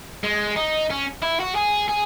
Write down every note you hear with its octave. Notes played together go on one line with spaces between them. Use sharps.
G#3
D#4
C#4
E4
F#4
G#4
G#4